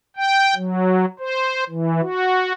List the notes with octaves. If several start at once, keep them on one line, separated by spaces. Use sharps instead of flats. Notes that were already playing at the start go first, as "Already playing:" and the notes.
G5
F#3
C5
E3
F#4